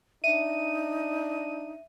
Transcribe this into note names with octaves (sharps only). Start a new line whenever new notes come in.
D4 D#4 E5 D#7